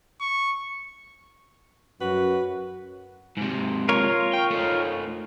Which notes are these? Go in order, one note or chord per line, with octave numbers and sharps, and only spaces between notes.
C#6
F#2 F#4 B4
G#2 C3
F4 A#4 C#5
G5
A3 D#4